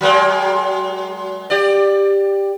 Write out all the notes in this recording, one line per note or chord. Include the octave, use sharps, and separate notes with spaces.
F#3 G#3 A#3
G4 D5